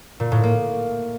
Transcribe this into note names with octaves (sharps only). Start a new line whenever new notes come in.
A#2
A2
A#3